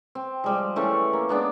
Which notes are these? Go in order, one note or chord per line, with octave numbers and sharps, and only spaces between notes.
C4
F3 G3 G#3
E3 A3 C#4 C#6
A#3
G#3 B3 D4 D5